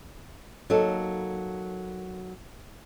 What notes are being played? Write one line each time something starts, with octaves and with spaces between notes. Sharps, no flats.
F#3 A#3 D#4 A4